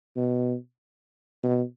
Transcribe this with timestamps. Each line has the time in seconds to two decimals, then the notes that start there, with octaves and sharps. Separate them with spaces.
0.17 B2
1.43 B2